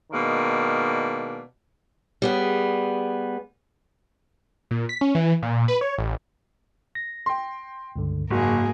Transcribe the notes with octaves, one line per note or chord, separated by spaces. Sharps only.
B2 D#3 G#3 A#3 D4
G3 B3 G#4
A#2
B6
C#4
E3
A#2
B4
C#5
A1
A#6
G5 C6
C#2 G2 D3
F#1 G#2 A#3 F#4 G#4